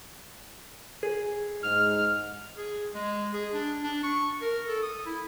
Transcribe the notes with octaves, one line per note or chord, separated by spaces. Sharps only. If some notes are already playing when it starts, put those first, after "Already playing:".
G#4
G#2 F6
G#4
G#3
G#4
D4
D4
C#6
A#4
A4
D#6
E4